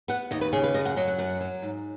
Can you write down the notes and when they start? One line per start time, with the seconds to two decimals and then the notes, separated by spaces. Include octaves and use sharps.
0.08 B3 F#5
0.31 D#2 D#5
0.41 B4
0.53 C#3 G#4
0.64 B4
0.74 F#2 D#5
0.85 F#5
0.96 F#3 D#5
1.08 F#5
1.18 F#2 F#5
1.41 F#3
1.62 G#2